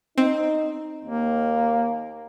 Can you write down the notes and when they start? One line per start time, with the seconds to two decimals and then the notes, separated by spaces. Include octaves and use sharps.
0.18 C4 D#4
1.05 D#2 A#3